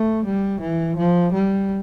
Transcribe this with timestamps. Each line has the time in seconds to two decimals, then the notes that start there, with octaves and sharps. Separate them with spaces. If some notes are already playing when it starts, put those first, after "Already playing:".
Already playing: A3
0.25 G3
0.61 E3
0.97 F3
1.33 G3